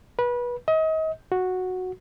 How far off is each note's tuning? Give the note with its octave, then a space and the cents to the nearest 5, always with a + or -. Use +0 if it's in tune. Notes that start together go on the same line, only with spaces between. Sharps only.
B4 -25
D#5 +35
F#4 -5